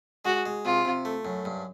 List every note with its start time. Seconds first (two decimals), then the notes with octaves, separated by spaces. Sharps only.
0.25 G#3 F#4
0.46 G#3
0.65 C3 F4
0.85 C3
1.05 A3
1.25 F#2
1.45 G2